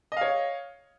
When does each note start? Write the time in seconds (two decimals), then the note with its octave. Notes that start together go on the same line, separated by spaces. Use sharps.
0.12 D#5
0.17 F5
0.21 C#5